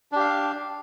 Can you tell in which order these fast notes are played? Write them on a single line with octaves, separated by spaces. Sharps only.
D4 G4 F5